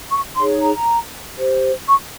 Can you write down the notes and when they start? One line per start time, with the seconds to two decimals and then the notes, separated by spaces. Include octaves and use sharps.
0.11 C#6
0.36 D#4 G#4 C#5 C6
0.61 A#5
1.36 G4 C5
1.88 C#6